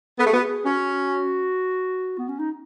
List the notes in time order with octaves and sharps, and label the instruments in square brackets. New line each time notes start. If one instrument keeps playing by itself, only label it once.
[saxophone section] B3 [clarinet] A4
[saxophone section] A3 [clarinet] G#4
[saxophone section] B3 [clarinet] F#4
[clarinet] G#4
[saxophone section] C#4 [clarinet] F#4
[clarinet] B3
C#4
D#4